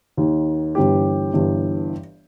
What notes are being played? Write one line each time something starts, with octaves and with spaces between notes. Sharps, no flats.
D#2 D#3
G1 G2 E3 G4
G1 G2 E3